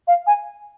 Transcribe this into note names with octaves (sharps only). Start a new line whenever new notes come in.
F5
G#5